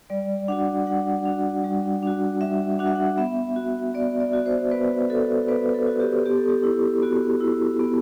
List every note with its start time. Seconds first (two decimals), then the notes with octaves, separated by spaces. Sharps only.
0.10 G3 D5
0.48 D4 F#4 F#5
0.87 G3 F#5
1.26 D4 F#4
1.64 G3
2.03 D4 F#4
2.41 G3 E5
2.79 D4 F#4 F#5
2.87 E5
2.95 F#5
3.18 B3 E5
3.56 F#4
3.94 B3 D5
4.20 D5
4.33 F#4
4.46 C5
4.71 B3 B4
5.10 F#4 A4
5.48 B3 B4
5.74 A4
5.87 F#4
6.00 G4
6.26 B3 G4
6.37 A4
6.49 G4
6.64 E4
7.02 B3 F#4
7.41 E4
7.80 B3